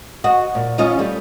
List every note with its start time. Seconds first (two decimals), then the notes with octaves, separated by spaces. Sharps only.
0.24 F#4 D#5
0.55 A#2
0.78 C#4 F4 D#5
0.99 G3 A3